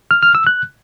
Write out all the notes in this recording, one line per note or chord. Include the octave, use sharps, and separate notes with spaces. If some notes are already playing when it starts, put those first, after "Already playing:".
F6
F6
E6
F#6